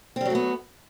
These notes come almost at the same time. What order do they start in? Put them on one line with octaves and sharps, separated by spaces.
C4 G3 F#3 A3 B3